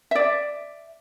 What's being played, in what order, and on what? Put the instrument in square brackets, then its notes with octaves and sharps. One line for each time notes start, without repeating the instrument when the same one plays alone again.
[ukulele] D5 E5